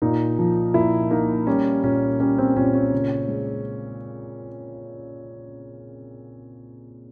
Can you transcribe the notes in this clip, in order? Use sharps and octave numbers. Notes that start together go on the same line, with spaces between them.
A#2 D#4
F3
A#2 E4
A#3 D#4
G3 C#4
A#2 C#4
G3 C#4
C4
A#2 C#4
C#4
C#3
G#3